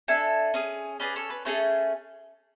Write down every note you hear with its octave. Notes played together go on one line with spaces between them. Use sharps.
D4 A4 E5 G#5
C#4 G#4
C#4 G#4 B4 D5
A4 C#5
B4
A3 C#4 G#4 A4 C#5